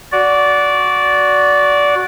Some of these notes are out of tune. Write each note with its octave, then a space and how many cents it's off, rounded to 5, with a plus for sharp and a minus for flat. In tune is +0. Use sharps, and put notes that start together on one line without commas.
F#4 -5 D5 -15